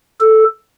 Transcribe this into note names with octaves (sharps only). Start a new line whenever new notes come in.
A4